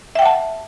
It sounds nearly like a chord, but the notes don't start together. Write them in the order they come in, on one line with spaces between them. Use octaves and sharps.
E5 G5 F#5 A5